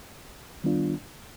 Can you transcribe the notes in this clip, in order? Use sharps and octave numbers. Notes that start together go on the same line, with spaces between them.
D#3 G3 B3 D4 F4